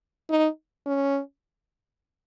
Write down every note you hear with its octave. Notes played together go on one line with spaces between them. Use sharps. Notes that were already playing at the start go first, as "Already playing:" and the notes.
D#4
C#4